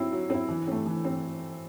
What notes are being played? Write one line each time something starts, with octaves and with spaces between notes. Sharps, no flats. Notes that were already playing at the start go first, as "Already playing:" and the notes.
Already playing: F#3 C4 E4
F#3
C4 E4
E3
A3 C4
E3
C4